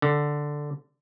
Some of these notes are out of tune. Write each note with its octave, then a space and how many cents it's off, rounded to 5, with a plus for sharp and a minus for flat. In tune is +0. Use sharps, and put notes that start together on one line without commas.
D3 +0